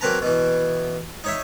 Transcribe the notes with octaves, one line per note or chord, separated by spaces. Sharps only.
F#3 A#3 C4 B4 A5 A#5
B2 E3
D#4 C#5 E5